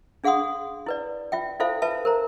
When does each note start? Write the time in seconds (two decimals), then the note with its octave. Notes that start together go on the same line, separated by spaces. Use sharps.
0.24 D4 G#4 F5 F#5 C6 D#6
0.86 E4 B4 D5
1.32 F4 E5 G5
1.60 E4 F4 A4 C5 E5 F5
1.82 F4 B4 E5 A5
2.05 A#4 C5 A#5